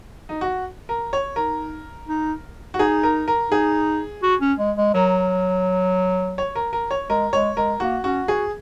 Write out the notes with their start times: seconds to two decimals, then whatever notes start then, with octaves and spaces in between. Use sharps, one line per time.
0.29 D#4
0.41 F#4
0.89 A#4
1.13 C#5
1.36 D#4 A#4
2.08 D#4
2.74 F#4
2.79 D#4 G#4
3.03 A#4
3.28 A#4
3.51 D#4 G#4
4.23 F#4
4.41 C#4
4.59 G#3
4.77 G#3
4.94 F#3 A#4
6.38 C#5
6.55 A#4
6.73 A#4
6.91 C#5
7.10 G#3 A#4
7.33 G#3 C#5
7.57 G#3 A#4
7.80 A#3 F#4
8.04 C#4 F#4
8.28 F#4 G#4